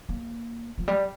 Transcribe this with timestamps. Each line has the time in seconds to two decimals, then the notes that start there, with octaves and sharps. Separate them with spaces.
0.09 A#3
0.78 F3
0.88 G3